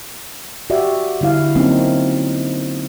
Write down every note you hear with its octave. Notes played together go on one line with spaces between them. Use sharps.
F#4 G4 D5 E5
D3 G3 E4 F5
F#3 A#3 C4 C#4 D#4